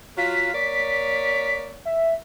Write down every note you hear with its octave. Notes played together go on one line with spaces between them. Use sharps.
F#3 F4 B6
A#3 C#5 D5
E5